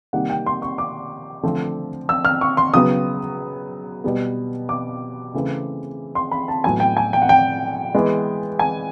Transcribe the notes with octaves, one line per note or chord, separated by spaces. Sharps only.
C3 D#3 G3 A#3 F#5
G5
C6
C#6
D6
D3 F3 A3 C4
E6
F6
C#6
C6
C#3 F#3 B3 D#6
B2 G3 B3
D6
C#3 E3 A3 C4
C6
B5
A5
A2 F#3 B3 G#5
G5
G#5
G5
F#5
G5
E3 G#3 B3
G#5